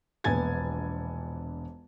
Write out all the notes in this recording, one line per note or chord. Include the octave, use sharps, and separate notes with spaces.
E1 A#1 B3 G#5 G#6 A6